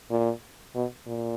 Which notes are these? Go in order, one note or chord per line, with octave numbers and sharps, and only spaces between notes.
A#2
B2
A#2